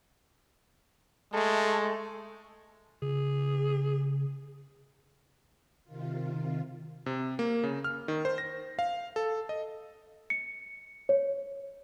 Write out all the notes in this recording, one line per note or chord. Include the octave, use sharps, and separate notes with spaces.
G#3 A3 A4
C#3 G#4
C3 D#3 F4
C3
A#3
C#3
F6
D#3
C5
A#6
F5
A4
D#5
C#7
C#5